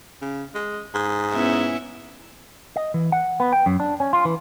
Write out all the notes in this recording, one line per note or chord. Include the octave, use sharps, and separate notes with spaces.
C#3
G#3
G#2
B3 C#4 E4
D#5
E3
F#5
B3
G5
F#2
D4
C#4
F4
E3